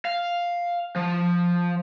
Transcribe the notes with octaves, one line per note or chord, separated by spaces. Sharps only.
F5
F3